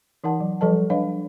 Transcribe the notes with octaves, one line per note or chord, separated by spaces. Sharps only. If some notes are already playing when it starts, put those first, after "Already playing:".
E3 D#4 A#4 F#5 A5
F#3
F3 G3 A4 B4 D#5 A5
D4 B4 C#5 D#5 F5